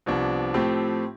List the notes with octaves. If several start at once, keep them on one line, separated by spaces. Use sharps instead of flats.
C2 C3 F3 B3 D4
A2 F3 A3 C4 G4